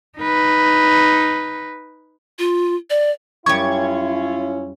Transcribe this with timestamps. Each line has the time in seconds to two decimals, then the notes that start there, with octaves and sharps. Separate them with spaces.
0.19 D#4 B4
2.39 F4
2.90 D5
3.46 F#2 G3 C#4 E4 F4 C#6 G#6